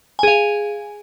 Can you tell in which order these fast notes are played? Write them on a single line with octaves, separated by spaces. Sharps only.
G#5 G#4 F5